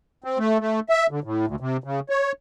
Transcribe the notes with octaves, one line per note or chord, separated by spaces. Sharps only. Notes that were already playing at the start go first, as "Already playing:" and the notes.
C4
A3
A3
E5
D3
A2
D2
C3
C#3
C#5